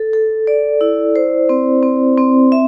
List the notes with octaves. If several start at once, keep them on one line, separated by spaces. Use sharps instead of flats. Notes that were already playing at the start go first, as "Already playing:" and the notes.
Already playing: A4
A4
D5
E4
C5
C4
C4
C4
E5